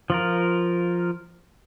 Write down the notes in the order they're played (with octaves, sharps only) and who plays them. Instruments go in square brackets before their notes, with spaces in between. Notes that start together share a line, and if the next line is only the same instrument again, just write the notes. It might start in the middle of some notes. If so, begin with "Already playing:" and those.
[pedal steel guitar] F3 F4 A#4